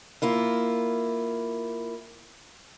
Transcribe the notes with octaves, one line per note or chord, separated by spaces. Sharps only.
A#3 E4 F4